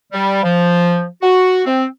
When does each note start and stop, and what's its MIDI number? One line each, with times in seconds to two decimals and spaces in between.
0.12 0.40 55
0.43 1.05 53
1.22 1.62 66
1.65 1.85 60